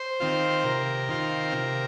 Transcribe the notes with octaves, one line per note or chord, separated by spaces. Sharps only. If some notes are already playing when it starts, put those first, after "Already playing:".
Already playing: C5
D#3 C4 F4
C3 A#4
D#3 C4 F4
C3